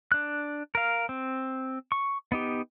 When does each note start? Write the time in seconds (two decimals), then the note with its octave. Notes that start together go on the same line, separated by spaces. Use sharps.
0.12 D4 F#6
0.75 A#4 F5
1.09 C4
1.92 C#6
2.32 B3 D#4 G4